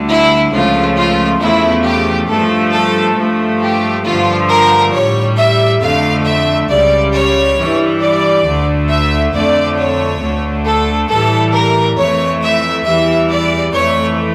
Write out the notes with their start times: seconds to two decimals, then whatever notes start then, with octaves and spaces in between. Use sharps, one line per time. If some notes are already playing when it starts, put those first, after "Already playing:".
Already playing: D2 D3 G3
0.08 E4
0.51 C#2 C#3 F3 A3 F4
0.96 F4
1.40 E2 C#3 F3 A3 E4
1.84 G4
2.28 G2 F3 A3 A4
2.72 A4
3.17 G2 F3 A3
3.61 G4
4.04 G2 D3 F3 A3 F4
4.49 A#4
4.92 A2 G3 C#5
5.36 E5
5.80 F2 D3 A3 F5
6.24 E5
6.68 C#2 C#3 G3 D5
7.13 C#5
7.57 G2 E3 G3
8.01 D5
8.45 D2 D3 A3
8.89 E5
9.33 F2 D3 A3 D5
9.77 C#5
10.21 D2 D3 A3
10.65 A4
11.09 A2 E3 G3 A4
11.53 A#4
11.98 F2 E3 A3 C#5
12.41 E5
12.85 E2 E3 G3 E5
13.30 D5
13.73 F2 E3 A3 C#5